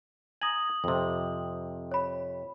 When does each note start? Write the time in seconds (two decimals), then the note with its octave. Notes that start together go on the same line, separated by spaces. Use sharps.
0.42 G#5 A#5 D#6 F#7
0.84 F2 C3
1.92 C#5 B5